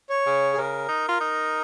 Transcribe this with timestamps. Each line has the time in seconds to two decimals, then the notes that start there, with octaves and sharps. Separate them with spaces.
0.10 C#5
0.26 C#3
0.53 G#4
0.57 C#3 A#4
0.88 D#4
1.08 F4
1.21 D#4